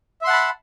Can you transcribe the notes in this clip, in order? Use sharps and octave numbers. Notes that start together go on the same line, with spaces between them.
E5 F#5 A5 B5 C6